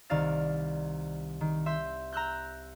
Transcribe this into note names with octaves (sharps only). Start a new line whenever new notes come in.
C2 D#3 D5 F5 A6
D#3
E5 C6 G6
A#5 E6 F#6 G6